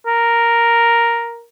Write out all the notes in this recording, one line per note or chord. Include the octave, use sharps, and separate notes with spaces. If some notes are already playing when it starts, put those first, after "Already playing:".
A#4